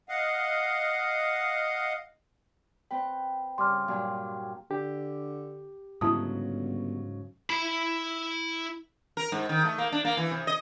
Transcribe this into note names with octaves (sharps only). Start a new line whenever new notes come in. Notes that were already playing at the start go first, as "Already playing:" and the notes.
D#5 F5 F#5
C4 B4 G5
G2 C#3 C6 D6 F6
G2 A#2 F#3
D3 G4
G1 G#2 C#3 F#3 E4 A5 D#6
E4 B5
A#4
G#2
D#3
A3
A#3
D4
A#3
E3
C3
D#5